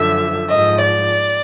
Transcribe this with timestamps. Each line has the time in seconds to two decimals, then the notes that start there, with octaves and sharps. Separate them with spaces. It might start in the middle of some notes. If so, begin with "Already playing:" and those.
Already playing: F#2 D3 F3 E5
0.49 G#2 F3 D#5
0.82 D5